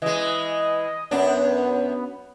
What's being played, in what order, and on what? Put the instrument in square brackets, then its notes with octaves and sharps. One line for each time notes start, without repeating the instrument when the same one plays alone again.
[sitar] E3 G#3 [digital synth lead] D#5
[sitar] F#2 D4 [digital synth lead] B3